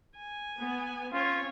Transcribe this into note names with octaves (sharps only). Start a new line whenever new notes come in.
G#5
B3
C4 C#4 F4 C#5